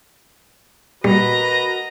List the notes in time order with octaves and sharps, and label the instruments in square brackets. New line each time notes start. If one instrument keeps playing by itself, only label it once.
[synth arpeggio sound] A#2 G3 [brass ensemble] F#4 A#4 B4 [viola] D#5 A#5